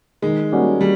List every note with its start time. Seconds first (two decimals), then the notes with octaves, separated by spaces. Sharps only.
0.22 D#3 G#3
0.52 G3 A#3 C#4 F#4
0.81 G3